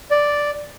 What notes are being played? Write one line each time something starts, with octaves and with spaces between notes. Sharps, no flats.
D5